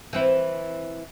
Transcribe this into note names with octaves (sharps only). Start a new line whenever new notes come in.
E3 C4 E4